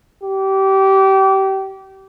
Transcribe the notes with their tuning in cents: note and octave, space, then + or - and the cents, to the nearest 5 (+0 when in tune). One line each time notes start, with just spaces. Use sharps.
G4 -25